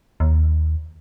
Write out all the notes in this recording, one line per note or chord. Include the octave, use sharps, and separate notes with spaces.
D#2